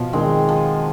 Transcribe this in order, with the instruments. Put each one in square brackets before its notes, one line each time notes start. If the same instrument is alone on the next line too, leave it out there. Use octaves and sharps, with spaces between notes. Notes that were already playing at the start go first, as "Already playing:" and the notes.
Already playing: [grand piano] B2 [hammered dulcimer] F3
[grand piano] D#3 [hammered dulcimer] G#3 C4
[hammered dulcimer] F3